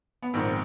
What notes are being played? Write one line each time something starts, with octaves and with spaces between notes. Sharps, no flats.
B3
A#1 G#2 D#3 C4